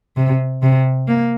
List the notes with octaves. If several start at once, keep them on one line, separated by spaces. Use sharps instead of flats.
C3
C3
A#3